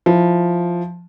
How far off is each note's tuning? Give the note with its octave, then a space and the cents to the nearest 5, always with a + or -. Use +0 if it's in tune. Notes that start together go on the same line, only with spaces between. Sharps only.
F3 +0 E4 +0